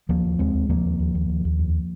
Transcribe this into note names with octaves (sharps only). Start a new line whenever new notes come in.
D#2 F3 A#3
D#2
D#2 G#3 C4
D#2
D#2 F3 A#3
D#2
D#2
D#2
D#2
D#2
F2